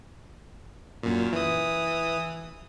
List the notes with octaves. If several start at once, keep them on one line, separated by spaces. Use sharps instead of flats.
F#2 A#2
E3 D#6